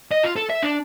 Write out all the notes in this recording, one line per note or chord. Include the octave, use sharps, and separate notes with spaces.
D#5
F4
A4
E5
D4